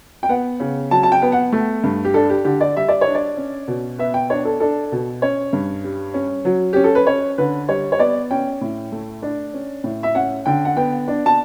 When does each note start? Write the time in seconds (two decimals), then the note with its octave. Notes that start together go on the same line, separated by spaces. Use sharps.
0.23 G5
0.29 B3 F#5
0.60 C#3
0.91 F#3 A5
1.03 A5
1.12 G5
1.22 B3
1.32 F#5
1.52 A3
1.84 G2
2.05 G4
2.14 D4 A4
2.30 G4
2.45 D3 G4
2.61 D5
2.76 G3 E5
2.89 D5
3.01 C#5
3.07 D4
3.15 D5
3.37 C#4
3.68 B2
3.98 B3 E5
4.14 G5
4.30 D4 C#5
4.45 A4
4.60 D4 A4
4.92 B2
5.22 C#4 C#5
5.53 G2
5.84 G3
6.14 C#4
6.45 F#3
6.73 C#4 G4
6.84 A4
6.95 B4
7.07 C#4 C#5
7.38 D3 B4
7.69 G3 C#5
7.92 C#5
7.99 B3 D5
8.31 C#4 G5
8.61 A2
8.92 A3
9.22 D4
9.54 C#4
9.84 A2
10.03 E5
10.15 C#4 F#5
10.46 D3 G5
10.65 F#5
10.76 B3 G5
11.08 D4
11.26 A5